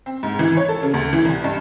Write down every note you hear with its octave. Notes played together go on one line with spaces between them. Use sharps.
C4
G#2
E3
C#5
A4
C#3
D2
E3
C2
G2